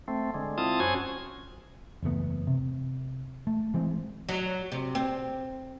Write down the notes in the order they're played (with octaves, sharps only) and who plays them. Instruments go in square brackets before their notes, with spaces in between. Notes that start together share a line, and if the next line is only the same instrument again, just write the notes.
[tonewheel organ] A3 C4
D3 G#3
C4 E4 F4 A5 D#6
F#2 C#4 F#4 C5 G#5 G#6
[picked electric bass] F#1 E2 A3 B3
C3
A3
E3 G#3 C4
[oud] F#3
C3
C4